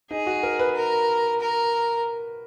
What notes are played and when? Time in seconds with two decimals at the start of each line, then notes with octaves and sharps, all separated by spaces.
0.10 D#4 G#4
0.27 F#4
0.43 A#4
0.59 B4
0.75 A#4
1.41 A#4